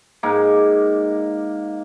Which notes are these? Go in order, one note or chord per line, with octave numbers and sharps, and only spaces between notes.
G#2 A#3